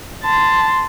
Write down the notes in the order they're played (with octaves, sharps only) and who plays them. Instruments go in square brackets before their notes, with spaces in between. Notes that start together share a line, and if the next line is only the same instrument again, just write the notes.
[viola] A5 C6